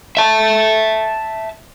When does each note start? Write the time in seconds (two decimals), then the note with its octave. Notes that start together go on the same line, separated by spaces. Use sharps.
0.17 E5 A5